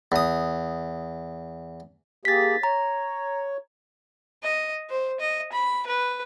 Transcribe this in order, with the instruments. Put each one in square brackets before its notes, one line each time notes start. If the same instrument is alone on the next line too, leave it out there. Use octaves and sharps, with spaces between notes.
[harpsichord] E2 D#6
[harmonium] A#3 G4 G#4 [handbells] A6 B6
[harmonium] C#5 [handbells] A#5
[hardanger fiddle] D#5
C5
D#5
B5
B4